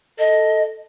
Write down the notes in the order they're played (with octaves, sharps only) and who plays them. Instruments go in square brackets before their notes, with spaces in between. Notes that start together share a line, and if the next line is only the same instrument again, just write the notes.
[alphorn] A4 [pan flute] D#5